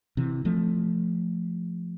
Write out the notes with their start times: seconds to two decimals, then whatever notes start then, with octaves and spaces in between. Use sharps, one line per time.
0.17 C3 E3
0.45 F3 A3